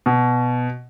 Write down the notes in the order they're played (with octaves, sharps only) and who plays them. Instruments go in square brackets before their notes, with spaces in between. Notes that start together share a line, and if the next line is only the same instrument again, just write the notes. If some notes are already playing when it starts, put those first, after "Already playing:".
[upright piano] B2